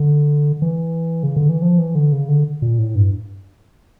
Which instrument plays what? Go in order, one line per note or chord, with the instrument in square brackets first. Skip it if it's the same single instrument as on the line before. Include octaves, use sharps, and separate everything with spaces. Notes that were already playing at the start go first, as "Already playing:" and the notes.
Already playing: [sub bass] D3
E3
C#3
D3
E3
F3
E3
D3
C#3
D3
A#2
A2
G2